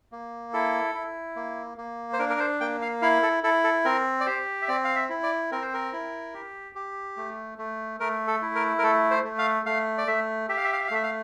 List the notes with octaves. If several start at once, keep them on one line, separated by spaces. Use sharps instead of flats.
A#3
E4 A4
E4
A#3
A#3
C5
D4 A#4
A#4
C5
A#3 G5
F5
E4 F5
A4
E4 A4
A4
C4 A#4
D5
G4 C5
E5
C4 D5
F5
E5
E4
D5
C4 A#4
C5
A#4
E4
G4
G4
A3
A3
A3 A#4
A4
E4
A#4
A#4
A3 A4
C5
A3
F5
A3 F5
D5
A3 E5
G4 E5
F5
E5
F5
E5
F5
A3 E5
F5